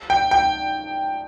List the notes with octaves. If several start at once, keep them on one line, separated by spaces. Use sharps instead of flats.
G5
G5